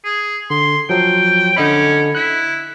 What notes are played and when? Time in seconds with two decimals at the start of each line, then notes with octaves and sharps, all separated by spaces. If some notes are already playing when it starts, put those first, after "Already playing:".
0.04 G#4
0.50 D3 C6
0.89 F3 F#3 G5
1.57 D3 C#4 D#5 B5
2.15 E4 F#6